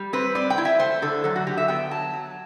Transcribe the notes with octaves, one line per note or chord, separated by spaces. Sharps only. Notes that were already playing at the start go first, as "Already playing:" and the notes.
Already playing: G3
C4 B4
C4 D5
G5
E4
E5
A3 C5
D3 A4
F#3 A4
F#4
D3 G4
E5
B3 G5
F#3 A5
F#3